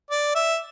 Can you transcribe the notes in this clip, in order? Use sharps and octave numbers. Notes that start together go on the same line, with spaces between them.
D5
E5